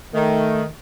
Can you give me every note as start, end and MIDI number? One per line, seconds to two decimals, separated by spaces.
0.14 0.65 51
0.14 0.63 57